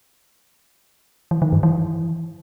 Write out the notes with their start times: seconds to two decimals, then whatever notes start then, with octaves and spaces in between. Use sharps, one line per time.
1.31 E3
1.42 D#3
1.52 G2
1.63 E3